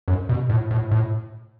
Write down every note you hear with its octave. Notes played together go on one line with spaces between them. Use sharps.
F#2
B2
A2
A2
A2